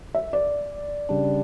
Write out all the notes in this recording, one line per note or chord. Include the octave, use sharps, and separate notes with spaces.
E5
D5
C#3 G3 D4